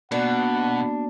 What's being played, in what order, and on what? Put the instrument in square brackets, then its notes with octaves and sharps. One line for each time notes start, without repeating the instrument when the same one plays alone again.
[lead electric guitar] B2 [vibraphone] A#3 B3 F#4 [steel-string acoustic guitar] D4 [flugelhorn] F#5